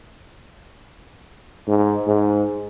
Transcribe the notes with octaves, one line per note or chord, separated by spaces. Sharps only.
G#2
G#2